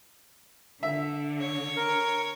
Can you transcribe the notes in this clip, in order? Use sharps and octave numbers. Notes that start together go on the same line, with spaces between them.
D3 E5
C#5
A#4